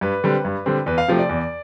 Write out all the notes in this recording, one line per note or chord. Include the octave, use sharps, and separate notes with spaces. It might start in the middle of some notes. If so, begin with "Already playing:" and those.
G2 B4
D3 G3 C4
G2
D3 G3 C4
E2 B4
F5
C3 F3 A3 C4
D5
E2